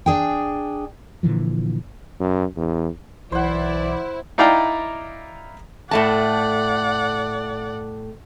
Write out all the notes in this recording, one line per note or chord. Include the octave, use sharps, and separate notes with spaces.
D4 G#4 G5
A#2 D3 E3 F3
F#2
E2
B1 E3 E4 C5 D5 F#5
D#4 E4 D5 F5 G5 A#5
A2 A3 D5 F#5 A5